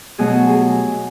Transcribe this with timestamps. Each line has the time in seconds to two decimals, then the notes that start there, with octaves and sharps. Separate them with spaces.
0.18 B2 F#3 A3 G#4
0.49 G#4